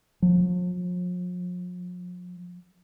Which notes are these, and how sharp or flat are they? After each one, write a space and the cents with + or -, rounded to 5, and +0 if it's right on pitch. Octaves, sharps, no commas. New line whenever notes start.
F3 +45